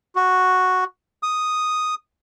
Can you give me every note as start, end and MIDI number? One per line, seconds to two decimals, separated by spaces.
0.16 0.84 66
1.23 1.95 87